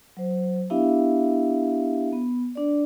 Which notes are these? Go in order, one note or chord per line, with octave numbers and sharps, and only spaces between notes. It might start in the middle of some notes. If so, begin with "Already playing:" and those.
F#3 C5
B3 D4 E4 G4 E5 F5
B3
D4 D5